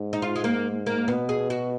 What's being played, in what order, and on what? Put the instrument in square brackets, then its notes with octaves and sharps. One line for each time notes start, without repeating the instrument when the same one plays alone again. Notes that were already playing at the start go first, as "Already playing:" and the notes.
Already playing: [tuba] G#2
[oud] D#4
F4
G#3
A#3
A#3
[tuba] B2 [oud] B3
[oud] G#4
F#4